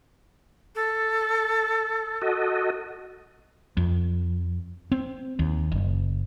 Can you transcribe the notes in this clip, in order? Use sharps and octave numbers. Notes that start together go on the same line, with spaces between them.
A4
F#4 A4 D#5
F2
C4
D#2
F#1